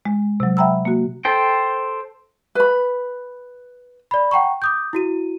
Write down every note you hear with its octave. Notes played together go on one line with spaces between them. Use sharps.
G#3
C3 F#3
E5 F#5 G5 A#5 B5 E6
A#3 F#4
A4 C5 G5
B4 B5
D5 B5
F#5 G5 A#5 C#6
D6 D#6 G6
E4 F#4 D#7